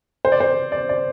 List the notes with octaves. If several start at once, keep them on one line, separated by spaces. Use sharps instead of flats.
C5
D5
C5
D5
D5